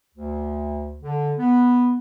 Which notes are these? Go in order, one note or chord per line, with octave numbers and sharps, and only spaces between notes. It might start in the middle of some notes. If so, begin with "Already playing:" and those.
D2
D3
B3